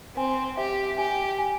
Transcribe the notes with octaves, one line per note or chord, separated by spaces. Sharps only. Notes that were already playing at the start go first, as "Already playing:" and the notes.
C4 G#5
G4 E5
G4 G#5
G#5